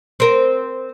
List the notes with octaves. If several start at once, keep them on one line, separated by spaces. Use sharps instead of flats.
C4 A#4